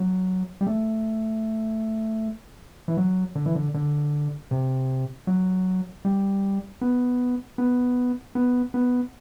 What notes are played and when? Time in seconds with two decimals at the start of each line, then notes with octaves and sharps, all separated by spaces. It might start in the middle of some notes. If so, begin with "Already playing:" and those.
Already playing: F#3
0.61 G3
0.67 A3
2.88 E3
2.97 F#3
3.35 D3
3.46 E3
3.55 D3
3.74 D3
4.51 C3
5.27 F#3
6.05 G3
6.81 B3
7.58 B3
8.35 B3
8.74 B3